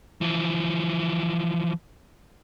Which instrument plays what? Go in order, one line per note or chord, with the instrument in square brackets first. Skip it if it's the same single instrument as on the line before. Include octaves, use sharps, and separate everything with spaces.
[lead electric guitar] E3 F3